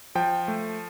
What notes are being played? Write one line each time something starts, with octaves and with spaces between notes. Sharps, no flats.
F3 G5
A3